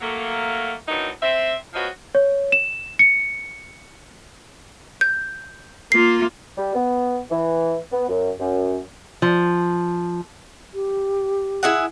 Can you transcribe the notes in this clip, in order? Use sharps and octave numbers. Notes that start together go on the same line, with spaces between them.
F#3 A3 A#3
D#3 E3 F#3 A#3 D4 D#4
C4 E5
F3 C4 F#4 B4 C#5 D#5
C#5
E7
C#7
G6
A#3 F4 C7
G3
B3
E3
B3
F#2
F#2
F3
G4
E4 G#4 F#5